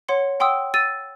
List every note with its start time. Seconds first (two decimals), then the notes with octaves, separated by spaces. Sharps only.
0.08 C#5 F#5 C6 C#7
0.40 F#5 G5 C6 D#6 E6
0.74 E6 A6 D#7